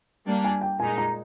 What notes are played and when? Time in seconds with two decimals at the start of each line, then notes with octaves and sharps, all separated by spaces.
0.27 G3 A#3 D4
0.44 G#5
0.61 G5
0.79 A#2 G#3 D#4 G#5
0.98 A#5